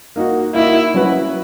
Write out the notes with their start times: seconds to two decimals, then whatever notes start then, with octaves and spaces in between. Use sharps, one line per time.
0.16 A#3 D#4 F#4
0.55 A#3 D#4 E4 F#4
0.94 F#3 C#4 F#4 B4